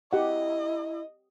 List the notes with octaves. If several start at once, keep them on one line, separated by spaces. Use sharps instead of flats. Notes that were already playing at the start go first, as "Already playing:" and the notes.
E4 G4 D#5 F#5